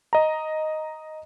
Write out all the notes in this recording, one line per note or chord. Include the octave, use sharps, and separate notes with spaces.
D#5 A#5